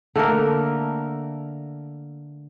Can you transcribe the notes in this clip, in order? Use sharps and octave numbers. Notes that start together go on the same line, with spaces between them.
D3 A3 A#3 A#4